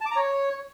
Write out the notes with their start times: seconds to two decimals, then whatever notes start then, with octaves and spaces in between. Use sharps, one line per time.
0.01 A5
0.06 D6
0.11 A#5
0.16 C#5